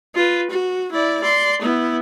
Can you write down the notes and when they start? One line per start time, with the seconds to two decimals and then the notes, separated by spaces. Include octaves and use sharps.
0.15 F4 B4
0.50 F#4
0.92 E4 D5
1.21 D5 C6
1.62 B3 E4